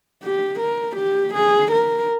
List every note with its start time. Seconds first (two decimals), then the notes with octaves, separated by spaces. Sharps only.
0.23 G4
0.60 A#4
0.97 G4
1.34 G#4
1.71 A#4